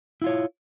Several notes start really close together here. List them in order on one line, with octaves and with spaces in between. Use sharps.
E4 F4 C#5